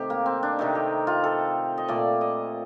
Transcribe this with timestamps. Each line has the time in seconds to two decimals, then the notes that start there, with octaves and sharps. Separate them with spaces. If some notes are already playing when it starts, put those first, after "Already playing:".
Already playing: C3 D#3 A3 G4
0.10 A#3
0.26 C4
0.43 D4
0.59 C3 D#3 A3 D#4
0.75 G4
1.07 F4
1.24 A4
1.78 D#5
1.88 A#2 A3 D5
2.21 D#5